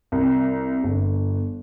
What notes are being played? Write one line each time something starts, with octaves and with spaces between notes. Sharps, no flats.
C2
G1